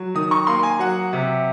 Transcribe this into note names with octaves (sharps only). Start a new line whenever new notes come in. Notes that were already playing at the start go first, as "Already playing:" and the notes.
Already playing: F#3
D#3 D#6
C#6
A#3 C6
G#5
F#3 F#5
C3